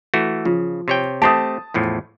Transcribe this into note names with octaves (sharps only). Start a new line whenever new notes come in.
E3 A3 F#4
C#3 F3
C3 C#5 G5
A3 C4 G4 A5 D#6
E2 A2 F3